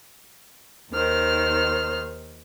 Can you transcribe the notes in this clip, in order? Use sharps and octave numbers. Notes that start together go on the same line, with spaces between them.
D#2 D#3 C5 F6